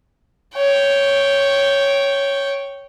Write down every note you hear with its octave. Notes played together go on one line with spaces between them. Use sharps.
C#5 G5